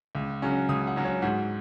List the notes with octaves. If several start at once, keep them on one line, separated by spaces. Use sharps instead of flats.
C#2
C#3 F#3 C#4
C#2 D#6
F#5
C#3 F#3 C#4
C#5
G#2 F#4